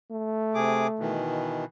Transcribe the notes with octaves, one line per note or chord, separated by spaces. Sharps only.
A3
C3 G#4 D6
B2 D#3 E3